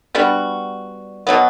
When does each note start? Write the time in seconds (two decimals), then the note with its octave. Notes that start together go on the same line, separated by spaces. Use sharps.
0.15 G3 B3 D4 F#4
1.27 B2 F#3 B3